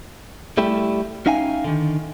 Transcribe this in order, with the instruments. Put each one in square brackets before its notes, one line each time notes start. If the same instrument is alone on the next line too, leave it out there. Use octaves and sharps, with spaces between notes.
[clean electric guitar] G3 A3 E4 G4
C#4 D#4 E5 F5 G5 G#5
D3 D#3